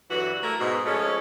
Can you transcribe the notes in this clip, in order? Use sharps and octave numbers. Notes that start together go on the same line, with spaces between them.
G2 D3 E3 F#3 F#4
A3 E4 A#4
G#2 B2
F3 G#3 A3 C#4